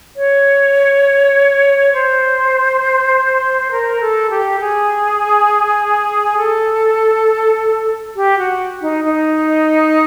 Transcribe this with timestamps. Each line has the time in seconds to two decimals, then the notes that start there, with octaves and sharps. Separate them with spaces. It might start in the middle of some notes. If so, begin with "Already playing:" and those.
0.16 C#5
1.93 C5
3.71 A#4
4.01 A4
4.30 G4
4.60 G#4
6.37 A4
8.16 G4
8.38 F#4
8.82 D#4
9.04 D#4